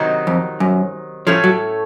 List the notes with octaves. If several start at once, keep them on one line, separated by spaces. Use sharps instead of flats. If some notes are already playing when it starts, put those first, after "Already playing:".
Already playing: C3 D#3 F#3 C4 D#4
F2
F#2
A2 F3 A3 C#4 A4 C#5
F#3